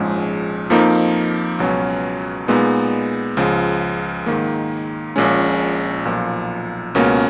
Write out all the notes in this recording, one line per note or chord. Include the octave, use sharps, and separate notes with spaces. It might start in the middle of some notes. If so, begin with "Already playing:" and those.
Already playing: A#1 G#2 F3 G#3 C#4
F2 F3 A#3 D#4
C#2 B2 F#3 C#4
A#2 G#3 B3 D#4
C#2 C#3 F3
G#2 D#3 A#3
A#1 A#2 G#3 C#4
B1 A#2 F3
C#2 B2 A#3 C#4